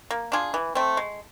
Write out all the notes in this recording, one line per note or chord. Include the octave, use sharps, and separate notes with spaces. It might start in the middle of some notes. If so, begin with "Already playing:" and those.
A#3
D4 F4 G#4
E3
A3 C4
G#3